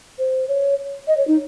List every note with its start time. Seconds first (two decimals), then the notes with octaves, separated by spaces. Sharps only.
0.19 C5
0.48 C#5
1.07 D#5
1.17 C#5
1.27 D#4